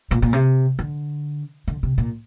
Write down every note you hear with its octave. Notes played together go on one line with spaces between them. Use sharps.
A#2
A#2
C3
D3
D3
C3
A#2